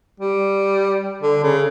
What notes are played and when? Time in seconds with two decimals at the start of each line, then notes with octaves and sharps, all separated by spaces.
0.20 G3
1.22 D3
1.43 C#3